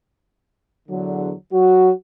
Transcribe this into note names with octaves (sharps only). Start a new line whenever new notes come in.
E2 D3 F#3
F#3 F#4